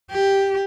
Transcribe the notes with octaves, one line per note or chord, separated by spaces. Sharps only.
G4